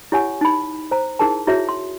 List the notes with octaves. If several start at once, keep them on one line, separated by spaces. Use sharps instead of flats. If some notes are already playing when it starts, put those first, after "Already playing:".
E4 G4 C#5 F#5 G#5 C#6
D#4 B5
C5 A#5
D#4 E4 G#4 A#4 A5
E4 F#4 G#4 C#5 E5
C6